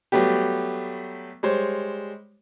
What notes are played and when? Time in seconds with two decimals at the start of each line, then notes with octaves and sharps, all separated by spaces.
0.12 F#3 G3 A3 B3 G4
1.43 G3 G#3 C5 C#5